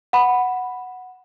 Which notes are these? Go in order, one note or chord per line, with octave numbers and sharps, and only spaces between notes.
F#5 B5